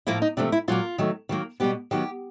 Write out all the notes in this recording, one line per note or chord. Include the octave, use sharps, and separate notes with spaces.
A2 F3 A#3 E4
D#4
C3 F3 A3 D4
E4
A#2 F#3 A#3 F4
D#3 F#3 A3
D#3 F#3 A#3
B2 G3 B3 G4
D#3 F#3 B3 G4